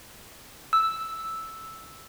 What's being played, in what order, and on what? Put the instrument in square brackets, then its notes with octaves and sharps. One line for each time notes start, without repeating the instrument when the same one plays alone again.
[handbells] E6